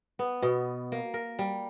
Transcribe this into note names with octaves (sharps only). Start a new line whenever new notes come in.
B3
B2
A#3
A#4
G3